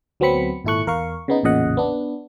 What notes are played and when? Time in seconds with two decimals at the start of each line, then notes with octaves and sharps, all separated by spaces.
0.20 D2 F#3 B3 C4 B5 C#7
0.64 G#1 A#2 E4 A4 C#6 F#6
0.87 E2 A#4 F5 C#6
1.28 C#3 B3 D#4
1.43 A1 E2 A#2 C#3 D#5 F#5
1.77 B3 D4